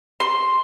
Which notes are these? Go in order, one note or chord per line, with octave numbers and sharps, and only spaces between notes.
C6